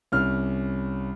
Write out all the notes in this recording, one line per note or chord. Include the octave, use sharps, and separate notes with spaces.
C2 C#4 F6